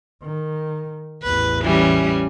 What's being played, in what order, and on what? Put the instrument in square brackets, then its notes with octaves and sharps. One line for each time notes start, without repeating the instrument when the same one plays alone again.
[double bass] D#3
[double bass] A1 E2 [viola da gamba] B4
[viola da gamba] E3 G3 C#4